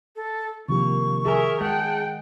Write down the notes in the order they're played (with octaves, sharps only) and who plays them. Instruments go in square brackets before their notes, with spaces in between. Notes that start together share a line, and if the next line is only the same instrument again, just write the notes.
[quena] A4
[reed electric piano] C3 F3 G4 [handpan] D#3 [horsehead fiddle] A#3 [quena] C#6
[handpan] G#4 [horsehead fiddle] A#4 E5
[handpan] G#3 [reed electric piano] G#4 [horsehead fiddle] F#5 G5 [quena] A5